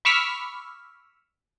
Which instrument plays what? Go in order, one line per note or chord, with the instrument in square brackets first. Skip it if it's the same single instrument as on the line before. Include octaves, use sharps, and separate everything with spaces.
[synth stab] B5 C#6 D6 E6 F6 B6